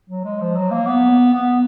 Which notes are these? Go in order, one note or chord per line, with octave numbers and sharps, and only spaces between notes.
F#3
G#3
F3
F#3
A#3
B3
B3